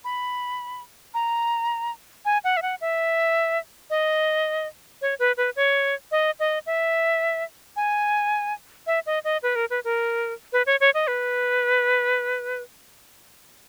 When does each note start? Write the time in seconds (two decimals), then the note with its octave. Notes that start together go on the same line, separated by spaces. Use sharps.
0.05 B5
1.14 A#5
2.25 G#5
2.44 F#5
2.57 E5
2.62 F#5
2.81 E5
3.90 D#5
5.02 C#5
5.19 B4
5.37 B4
5.56 C#5
6.12 D#5
6.40 D#5
6.66 E5
7.76 G#5
8.87 E5
9.06 D#5
9.24 D#5
9.43 B4
9.56 A#4
9.70 B4
9.84 A#4
10.53 B4
10.66 C#5
10.81 C#5
10.94 D#5
11.07 B4